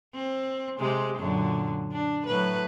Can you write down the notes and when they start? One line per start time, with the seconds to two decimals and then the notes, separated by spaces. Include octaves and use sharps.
0.14 C4
0.78 C3 G#3 G4
1.18 F#2 A#2 D3
1.92 D4
2.26 A2 F#3 B4